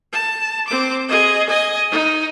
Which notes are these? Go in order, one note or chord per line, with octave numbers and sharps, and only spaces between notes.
A5
C4 D6
G#4 D#5
D#5 G#5
D#4